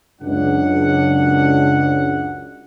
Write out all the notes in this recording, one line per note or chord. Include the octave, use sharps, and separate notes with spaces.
C#2 F#2 D4 F#5